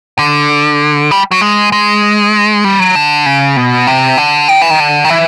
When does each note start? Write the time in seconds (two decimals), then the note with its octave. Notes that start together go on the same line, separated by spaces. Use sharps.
0.19 D3
1.11 G3
1.31 F#3
1.41 G#3
1.72 G#3
2.64 G3
2.79 F#3
2.95 D3
3.26 C#3
3.56 B2
3.87 C3
4.18 D3
4.49 D#3
4.62 E3
4.70 D#3
4.80 D3
5.04 D#3
5.10 E3